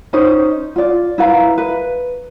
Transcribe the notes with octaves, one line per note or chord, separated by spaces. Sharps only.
C#4 D#4 C5 D#5
F4 D5
E4 B4 F5 A#5
B4